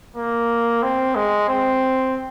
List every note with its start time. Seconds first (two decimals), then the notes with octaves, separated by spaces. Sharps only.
0.16 A#3
0.83 C4
1.15 G#3
1.49 C4